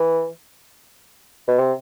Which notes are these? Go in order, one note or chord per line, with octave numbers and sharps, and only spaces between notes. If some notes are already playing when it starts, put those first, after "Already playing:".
Already playing: E3
B2
C3